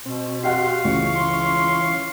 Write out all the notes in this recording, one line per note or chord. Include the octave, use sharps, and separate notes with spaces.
B2 C4
F#4 G4 D#5 F5 F#5 C6 F#6
C#2 E3 C#4 C#6
C6